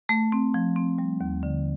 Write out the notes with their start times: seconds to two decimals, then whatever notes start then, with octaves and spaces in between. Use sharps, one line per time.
0.09 A3
0.32 C4
0.54 F3
0.76 C4
0.98 G3
1.21 D#2
1.43 D3